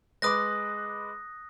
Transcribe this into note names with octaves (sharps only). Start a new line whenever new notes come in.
G#3 B4 D6 D#6 F#6 A#6